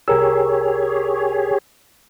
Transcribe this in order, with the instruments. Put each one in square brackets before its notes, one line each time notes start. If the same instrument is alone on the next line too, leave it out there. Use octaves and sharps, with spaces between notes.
[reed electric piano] C2 A#4 E6 [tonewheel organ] G4 G#4 C#5